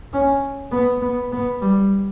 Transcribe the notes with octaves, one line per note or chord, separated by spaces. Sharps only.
C#4
B3
B3
B3
G3